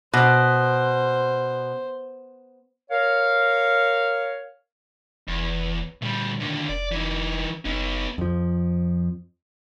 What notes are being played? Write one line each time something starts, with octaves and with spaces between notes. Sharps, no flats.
B2 C5
A#4 C#5 F5
F1 E2
D2 A#2 G3
D#2 D3
F1 D5
E3 D#4
F#1 B3 D#4
F2 F3